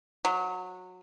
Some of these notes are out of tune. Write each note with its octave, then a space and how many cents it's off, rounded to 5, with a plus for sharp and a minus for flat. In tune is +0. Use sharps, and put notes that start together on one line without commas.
F#3 -20